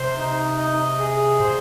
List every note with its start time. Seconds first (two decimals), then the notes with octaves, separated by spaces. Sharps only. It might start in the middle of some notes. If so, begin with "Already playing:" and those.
Already playing: C3 C5
0.18 D#4
0.58 D#5
0.99 G#4
1.40 A#2 C5